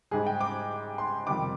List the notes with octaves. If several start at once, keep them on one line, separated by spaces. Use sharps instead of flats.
G#2 G3 G#4
G5
D6
C6
F2 C3 D#3 G3 D6